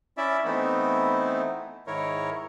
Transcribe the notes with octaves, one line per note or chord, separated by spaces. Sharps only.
C#4 E4 D5 E5
E3 A3 B3 C4 D#4 E4
G#2 D#3 E4 A#4 C#5